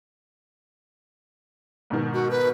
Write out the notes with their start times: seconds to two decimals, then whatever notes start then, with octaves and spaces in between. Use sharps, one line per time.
1.90 G#2 B2 D#3
2.14 F#4
2.31 B4